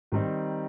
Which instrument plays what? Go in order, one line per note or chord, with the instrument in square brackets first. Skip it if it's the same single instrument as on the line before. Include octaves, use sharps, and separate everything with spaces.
[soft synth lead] G#2 [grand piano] D#3 G3 C4 D#4